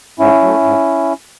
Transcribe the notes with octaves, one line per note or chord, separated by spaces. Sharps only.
G#2 C#4 E4
F#3 A3
G#2